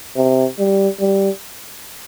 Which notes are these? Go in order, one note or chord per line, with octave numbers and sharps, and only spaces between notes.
C3
G3
G3